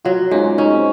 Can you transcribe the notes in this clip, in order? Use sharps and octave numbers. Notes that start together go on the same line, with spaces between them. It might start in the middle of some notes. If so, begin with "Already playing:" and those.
F#3 F4
G#2 C#4
C#4 D#4
C4